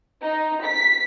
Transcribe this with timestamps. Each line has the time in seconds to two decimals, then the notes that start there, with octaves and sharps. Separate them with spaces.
0.22 D#4
0.64 B6